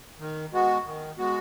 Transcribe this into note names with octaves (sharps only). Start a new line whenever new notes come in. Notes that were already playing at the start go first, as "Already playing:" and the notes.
D#3
G#3 B3 F#4
D#3
G#3 B3 F#4